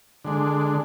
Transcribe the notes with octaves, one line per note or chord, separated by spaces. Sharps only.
D3 G#3 D4